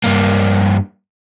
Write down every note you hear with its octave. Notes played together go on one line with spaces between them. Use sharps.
G2 A#3